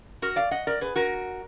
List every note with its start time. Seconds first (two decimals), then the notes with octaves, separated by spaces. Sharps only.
0.22 F#4 A#4
0.36 D5 F5
0.51 D#5 F#5
0.67 A#4 D5
0.81 G#4 B4
0.96 F#4 A#4